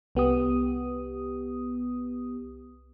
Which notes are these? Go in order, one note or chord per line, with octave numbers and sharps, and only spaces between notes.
C2 B3 G4 D#6